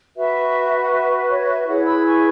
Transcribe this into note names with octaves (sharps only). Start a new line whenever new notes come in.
F#4 B4 E5
F#5
E5
C#5
E5
E4 G#4 B4 C#5 F#5
B5 E6
G#5 C#6